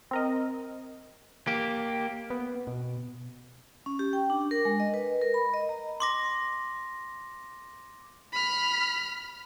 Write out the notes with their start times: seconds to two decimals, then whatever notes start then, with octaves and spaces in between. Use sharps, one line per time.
0.11 C4 A#4 D#5
1.47 A#3 G4
2.30 B3
2.67 B2
3.86 C#4
3.99 G4
4.13 G5
4.30 D4
4.51 A#4
4.65 G#3
4.80 D#5
4.94 B4
5.21 A#4
5.34 B5
5.54 D#5
5.69 A#5
6.00 C6 D6 A#6
8.33 B5 F6